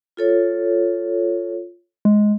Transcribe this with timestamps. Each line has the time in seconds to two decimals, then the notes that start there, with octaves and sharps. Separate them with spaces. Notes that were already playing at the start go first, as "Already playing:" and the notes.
0.17 F4 A4 C#5
2.05 G#3